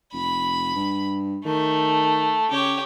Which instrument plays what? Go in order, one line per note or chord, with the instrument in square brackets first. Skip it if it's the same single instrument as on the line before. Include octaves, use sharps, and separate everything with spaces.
[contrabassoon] F1 [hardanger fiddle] B5
[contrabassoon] G2
[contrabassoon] D#3 [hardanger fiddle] A3
[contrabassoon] C#3 [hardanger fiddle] G4 C#5